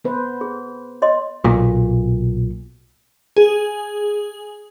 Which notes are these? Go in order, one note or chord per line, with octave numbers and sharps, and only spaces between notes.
B3 B4 C5
G#4
C#5 D#5 C6
B1 A#2
G#4